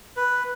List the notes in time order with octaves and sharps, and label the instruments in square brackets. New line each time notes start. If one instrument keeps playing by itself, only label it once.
[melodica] B4